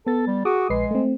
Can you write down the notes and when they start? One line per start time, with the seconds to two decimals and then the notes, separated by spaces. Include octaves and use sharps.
0.07 B3 A4 A6
0.27 G3
0.45 F#4 G#4 D6 D#6
0.70 A#1 G#3 B4 C7
0.91 A3 C4